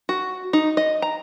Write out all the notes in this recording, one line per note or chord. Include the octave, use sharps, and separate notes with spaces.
F#4
D#4
D#5
A#5